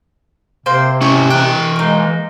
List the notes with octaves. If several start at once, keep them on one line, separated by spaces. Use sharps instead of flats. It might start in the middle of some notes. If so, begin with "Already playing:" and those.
C3 A#3 C5
C#4 E4 C#6
E3 G5 F#6
G#3 A#3 D#4